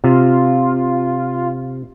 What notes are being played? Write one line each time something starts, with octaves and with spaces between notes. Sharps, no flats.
C3 F4